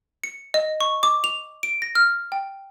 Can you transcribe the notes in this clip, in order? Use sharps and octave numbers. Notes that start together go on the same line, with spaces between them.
C#7
D#5
C#6
D6
F7
D7
A#6
F6
G5